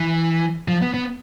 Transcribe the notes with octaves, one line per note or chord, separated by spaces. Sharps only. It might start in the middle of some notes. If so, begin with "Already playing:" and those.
Already playing: E3
F3
B3
B3